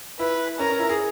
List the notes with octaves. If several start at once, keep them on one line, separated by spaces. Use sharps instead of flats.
E4 B4
C#4 A#4
C#4
E4
G#4